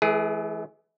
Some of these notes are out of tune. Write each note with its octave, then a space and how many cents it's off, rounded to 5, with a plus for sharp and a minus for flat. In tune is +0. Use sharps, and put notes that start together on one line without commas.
E3 +0 A3 -45 G#4 +0